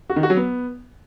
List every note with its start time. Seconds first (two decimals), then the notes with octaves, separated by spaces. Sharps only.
0.10 F#4
0.16 D#3
0.23 F#4
0.30 F#3
0.37 B3